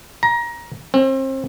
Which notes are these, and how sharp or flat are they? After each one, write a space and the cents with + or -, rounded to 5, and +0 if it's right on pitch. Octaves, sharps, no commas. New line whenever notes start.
A#5 +20
C4 +35